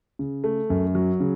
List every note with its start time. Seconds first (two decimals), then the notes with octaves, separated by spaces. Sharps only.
0.19 C#3
0.44 A3
0.70 F#2
0.95 F#3
1.20 C#3